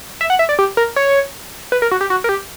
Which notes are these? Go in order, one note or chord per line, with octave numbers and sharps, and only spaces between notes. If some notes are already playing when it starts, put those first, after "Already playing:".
E5
F#5
E5
D5
G4
A#4
C#5
B4
A#4
F#4
G4
F#4
A#4
G4